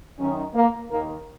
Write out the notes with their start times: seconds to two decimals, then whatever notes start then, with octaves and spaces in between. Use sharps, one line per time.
0.19 F#2 D#3 C#4
0.54 A#3
0.90 D#2 D#3 A#3